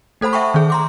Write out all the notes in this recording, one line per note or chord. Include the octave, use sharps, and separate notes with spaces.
A3 A4 C5 F#5 B5
E5 F#5 G5 A5 C#6
D#3 G#4
A#5 C6 D6